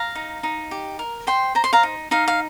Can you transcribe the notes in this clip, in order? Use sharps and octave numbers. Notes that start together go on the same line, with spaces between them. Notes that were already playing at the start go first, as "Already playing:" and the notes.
Already playing: F5 A#5
D#4
D#4
G4
A#4
C5 G5 C6
C5 A#5
C6
F5 A#5
D#4
D#4 F5
F5